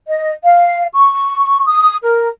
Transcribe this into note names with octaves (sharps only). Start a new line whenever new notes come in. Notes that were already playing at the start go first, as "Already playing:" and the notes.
D#5
F5
C#6
D#6
A#4